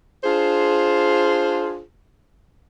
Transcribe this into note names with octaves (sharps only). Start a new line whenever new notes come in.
D4 F4 G#4 C5